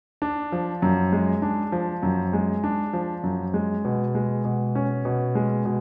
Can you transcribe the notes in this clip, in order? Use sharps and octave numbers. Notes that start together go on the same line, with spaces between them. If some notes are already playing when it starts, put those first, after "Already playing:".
D4
F3
F#2
G#3
D4
F3
F#2
G#3
D4
F3
F#2
G#3
B2
G#3
B2
C#4
B2
G#3
B2